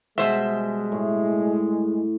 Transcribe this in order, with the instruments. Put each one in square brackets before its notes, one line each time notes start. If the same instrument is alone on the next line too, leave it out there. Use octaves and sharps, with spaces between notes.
[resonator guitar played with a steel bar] B2 C5 E5 [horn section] G3 G#3
[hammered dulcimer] A2